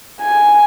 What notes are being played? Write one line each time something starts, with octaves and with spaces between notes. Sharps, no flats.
G#5